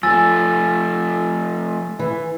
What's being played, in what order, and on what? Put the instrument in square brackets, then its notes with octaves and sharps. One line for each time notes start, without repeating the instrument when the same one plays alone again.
[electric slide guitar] F3 A3 [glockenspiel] G#5 E6 A6
[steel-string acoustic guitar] E3